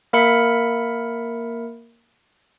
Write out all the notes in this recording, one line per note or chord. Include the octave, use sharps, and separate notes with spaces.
A#3 A#4 E5 B5 C#7